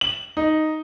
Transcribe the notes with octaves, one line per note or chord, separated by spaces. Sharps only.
F#7
D#4